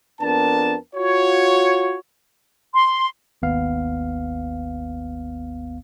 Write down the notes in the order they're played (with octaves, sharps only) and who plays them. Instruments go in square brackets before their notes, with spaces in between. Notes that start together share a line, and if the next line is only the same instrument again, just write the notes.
[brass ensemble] F2 B3 D4 A#4 A5
F4 F#4 C#5
[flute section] C6
[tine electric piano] G#1 D#2 B3 F5